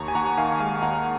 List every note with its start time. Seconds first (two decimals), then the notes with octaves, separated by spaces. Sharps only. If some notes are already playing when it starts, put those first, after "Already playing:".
Already playing: D#2 A#5 C#6
0.08 G#5
0.15 D#2 F#5 A#5
0.37 D#3 F5 G#5
0.60 G#3 F5 G#5
0.82 D#2 F#5 A#5